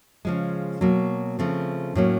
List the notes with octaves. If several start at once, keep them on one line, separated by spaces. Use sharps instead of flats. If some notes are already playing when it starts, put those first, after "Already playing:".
C#3 F3 G#3
B2 F#3 A#3
C#3 F3 A3 C4
A2 F#3 A#3 C#4